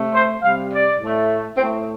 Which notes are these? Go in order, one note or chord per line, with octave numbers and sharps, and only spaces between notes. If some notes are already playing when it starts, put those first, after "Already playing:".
Already playing: C3 A3
C5
C3 G3 F5
D5
A2 A3
A2 C4
A3